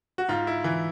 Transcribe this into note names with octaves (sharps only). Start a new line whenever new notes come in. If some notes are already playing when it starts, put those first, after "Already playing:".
F#4
G#2 F4
E4
E3